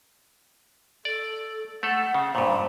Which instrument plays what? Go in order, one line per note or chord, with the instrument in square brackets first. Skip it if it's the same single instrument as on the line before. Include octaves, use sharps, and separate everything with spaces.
[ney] A4 [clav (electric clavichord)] D5
[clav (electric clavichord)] A3 A4 [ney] F#5
[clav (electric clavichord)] C#3
[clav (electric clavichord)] G2 A#2 [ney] C5